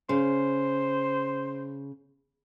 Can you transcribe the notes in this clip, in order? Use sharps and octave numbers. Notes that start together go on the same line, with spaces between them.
C#3 C5